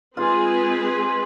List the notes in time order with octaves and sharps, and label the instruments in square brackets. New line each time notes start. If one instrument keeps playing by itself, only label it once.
[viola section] G#3 C4 G#4 B4 [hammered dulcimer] F4